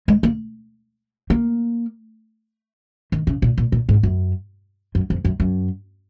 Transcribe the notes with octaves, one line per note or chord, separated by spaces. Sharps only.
G#3
A#3
A#3
D#3
C#3
A#2
A#2
A#2
G#2
F#2
F#2
F2
F#2
F#2